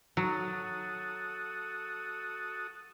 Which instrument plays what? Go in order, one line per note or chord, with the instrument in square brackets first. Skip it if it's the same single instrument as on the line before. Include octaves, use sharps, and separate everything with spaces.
[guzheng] F#3 [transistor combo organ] F#4 A4 D#6